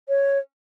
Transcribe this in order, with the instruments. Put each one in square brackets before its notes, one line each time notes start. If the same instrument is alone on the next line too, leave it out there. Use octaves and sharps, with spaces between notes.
[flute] C#5